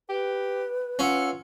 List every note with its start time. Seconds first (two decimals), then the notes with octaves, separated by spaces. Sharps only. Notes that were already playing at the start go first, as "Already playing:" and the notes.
0.09 G4 B4
0.99 C#4 F4 F#5 E6